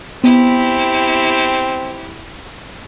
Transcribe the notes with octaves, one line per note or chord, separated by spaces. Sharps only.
B3 C4 E4 G4